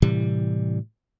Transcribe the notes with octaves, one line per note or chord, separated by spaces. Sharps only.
A2 C3 E3 G3